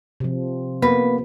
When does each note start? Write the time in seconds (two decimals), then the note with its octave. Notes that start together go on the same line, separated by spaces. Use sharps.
0.20 C3 F3
0.82 A#3 B3 B4